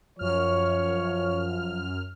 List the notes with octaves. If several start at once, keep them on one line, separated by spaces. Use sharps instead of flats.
F#2 F3 C#5 F6